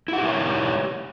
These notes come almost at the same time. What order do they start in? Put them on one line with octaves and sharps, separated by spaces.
E4 F#5 G4 E5 C#5